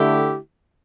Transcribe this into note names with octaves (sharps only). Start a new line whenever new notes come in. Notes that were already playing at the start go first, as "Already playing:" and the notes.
Already playing: D3 A3 E4 G4